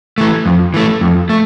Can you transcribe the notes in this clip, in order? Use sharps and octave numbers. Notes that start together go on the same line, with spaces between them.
E3 A3
F2
E3 A3
F2
A3